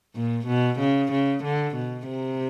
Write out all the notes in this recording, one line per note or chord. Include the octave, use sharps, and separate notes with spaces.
A#2
B2
C#3
C#3
D3
B2
C3